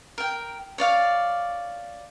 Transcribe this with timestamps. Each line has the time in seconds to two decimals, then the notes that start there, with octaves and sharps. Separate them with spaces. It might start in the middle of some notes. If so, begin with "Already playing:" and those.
0.18 A#4 G5
0.78 C#5 D5 F5